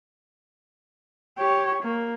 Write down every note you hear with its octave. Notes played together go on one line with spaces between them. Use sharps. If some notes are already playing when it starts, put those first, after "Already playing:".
G4 C#5
A#3